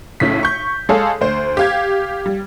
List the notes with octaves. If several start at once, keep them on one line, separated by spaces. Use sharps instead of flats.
B1 A2 C#3 B6
C#6 G6
G#3 G#4 A4 C#5 F5
D2 C5
G4 F5 G#6
G3